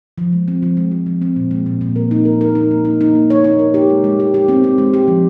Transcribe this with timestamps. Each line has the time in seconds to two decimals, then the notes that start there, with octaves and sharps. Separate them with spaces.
0.18 F3
0.33 G#3
0.48 C4
0.63 F3
0.77 G#3
0.91 F3
1.06 F3
1.22 C4
1.36 A#2
1.51 G#3
1.66 A#2
1.81 A#2
1.96 A#4
2.11 D#4
2.25 A#4
2.41 A#4
2.55 D#4
2.71 A#3
2.85 D#4
3.01 D#4
3.15 A#3
3.30 C#5
3.44 D#4
3.59 A#4
3.74 G4
3.90 G#3
4.04 G#3
4.20 G4
4.34 G4
4.48 C4
4.64 C4
4.78 G#3
4.94 G4
5.08 F3